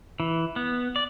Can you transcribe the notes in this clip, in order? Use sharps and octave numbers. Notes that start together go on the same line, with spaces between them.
E3
B3
D5